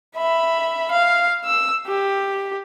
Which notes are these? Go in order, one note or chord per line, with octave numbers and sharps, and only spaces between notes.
E5 B5
F5
E6
G4